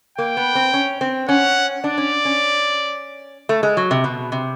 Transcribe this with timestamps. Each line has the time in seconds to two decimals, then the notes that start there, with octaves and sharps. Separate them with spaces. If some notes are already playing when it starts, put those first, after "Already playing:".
0.18 A#3 G5
0.37 B3
0.55 C4
0.74 C#4
1.01 C4
1.28 C#4 F#5
1.84 D4 D5
1.98 C#4
2.25 C#4
3.49 A3
3.63 G#3
3.77 F#3
3.91 C3
4.04 B2
4.32 C3